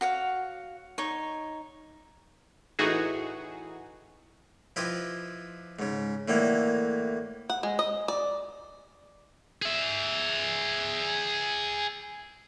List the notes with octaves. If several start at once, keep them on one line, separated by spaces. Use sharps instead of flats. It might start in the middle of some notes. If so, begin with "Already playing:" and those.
F#4 C#5 F5
D#4 C#5
A2 E3 D#4 F#4 G#4
F3 E4 G4 B4 D#5
G#2 C#3
A2 D3 E3 A#3
F#5
G#3
D#5
D5
G#4 E5